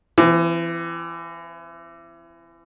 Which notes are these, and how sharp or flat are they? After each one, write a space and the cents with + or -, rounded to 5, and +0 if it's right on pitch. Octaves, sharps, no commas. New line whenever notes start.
E3 +30 C4 -10